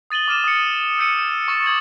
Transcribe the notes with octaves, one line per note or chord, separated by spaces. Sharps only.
D#6 A6 D#7 F#7 G7
D6 F6 D#7 E7
D#6 C#7
E6 G6 C#7 D#7
C#6 A6 E7
D6 D#6 G#6 F#7